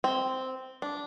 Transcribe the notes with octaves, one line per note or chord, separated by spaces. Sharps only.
C4
D4